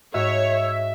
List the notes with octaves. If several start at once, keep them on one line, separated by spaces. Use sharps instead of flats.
G#2 F#4 C#5 D#5 E5